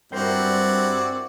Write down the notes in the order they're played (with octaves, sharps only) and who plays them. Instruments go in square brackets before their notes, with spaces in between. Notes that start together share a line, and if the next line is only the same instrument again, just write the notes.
[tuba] G2 [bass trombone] C4 [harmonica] E4 F#4 D5 [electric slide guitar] A#4 C5 G5